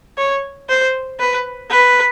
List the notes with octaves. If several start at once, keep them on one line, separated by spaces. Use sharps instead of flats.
C#5
C5
B4
B4